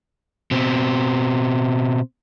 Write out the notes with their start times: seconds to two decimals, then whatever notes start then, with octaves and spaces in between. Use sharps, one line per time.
0.51 B2 C4